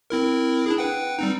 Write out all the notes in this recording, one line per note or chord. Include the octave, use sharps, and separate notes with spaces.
C4 E4 A#4
D4 E4 G#4
B4 F#5 G5
G3 C4 D#4